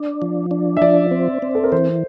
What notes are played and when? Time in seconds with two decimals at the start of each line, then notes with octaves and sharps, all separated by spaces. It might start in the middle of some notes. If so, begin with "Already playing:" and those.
Already playing: D4
0.22 F3
0.51 D4
0.77 E5
0.81 F3 D5
1.11 C4
1.42 C4
1.55 A4
1.64 A#4
1.72 E3 C5